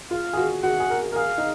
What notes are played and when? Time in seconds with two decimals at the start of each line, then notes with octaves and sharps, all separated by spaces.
0.11 F4 F5
0.33 G#4
0.37 F#4
0.63 F#4 F#5
0.80 G#4
0.90 A#4
1.12 A#4
1.16 G#4 F5
1.38 D#4